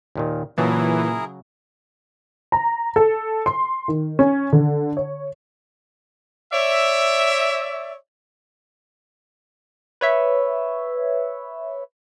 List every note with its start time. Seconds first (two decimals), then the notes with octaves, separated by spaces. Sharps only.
0.16 D#2 A#2 D#3
0.58 A#2 C#3 E3 F#3 E4 G#4 A#4 A5
2.52 A#5
2.96 A4
3.46 C6
3.88 D#3
4.19 C#4
4.53 D3
4.97 C#5
6.52 C#5 D5 E5
10.01 B4 C#5 E5